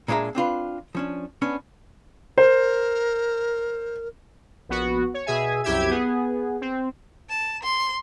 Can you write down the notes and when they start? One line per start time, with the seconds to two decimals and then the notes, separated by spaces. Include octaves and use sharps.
0.08 A#2 G#3 D4 C5 E5 A#5
0.35 C4 D4 F4 B4
0.95 F3 C#4 D4
1.42 B3 C#4 D4
2.38 A#4 C5
4.69 A#1 B3 F#4
5.14 C#5
5.26 B2 G#4 E5 G#5
5.64 C2 F#2 E4 G4 E5 G#6
5.90 B3 G#4
6.61 C4
7.29 A5
7.63 C6